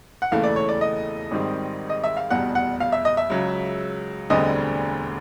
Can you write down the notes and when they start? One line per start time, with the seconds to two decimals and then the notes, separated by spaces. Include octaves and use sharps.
0.22 F#5
0.31 E1 D#2 C#3 E3 A3 F5
0.44 D5
0.56 C#5
0.69 D5
0.81 D#5
1.31 G#1 G#2 D#3 G3 C4
1.89 D#5
2.04 E5
2.17 F5
2.30 F1 E2 B2 G3 F#5
2.55 F#5
2.80 F5
2.92 E5
3.05 D#5
3.17 E5
3.30 C#2 C#3 F#3
4.30 E1 D2 D3 G3 C4 D#5